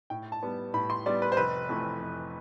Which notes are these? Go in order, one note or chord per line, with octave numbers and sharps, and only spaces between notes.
A2 G5
A5
G3 B3
A2 B5
C6
G3 B3 D5
B4
C5
F1 B4
F2 E3 A3
F1